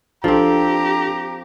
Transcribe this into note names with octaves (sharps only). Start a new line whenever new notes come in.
F3 C4 D4 G4 A4 A#5